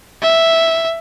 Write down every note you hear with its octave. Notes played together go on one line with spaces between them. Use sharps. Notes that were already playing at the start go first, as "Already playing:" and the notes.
E5